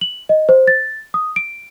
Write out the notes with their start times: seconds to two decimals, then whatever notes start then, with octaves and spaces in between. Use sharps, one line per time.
0.01 F#7
0.29 D#5
0.49 C5
0.67 A6
1.14 D#6
1.36 D7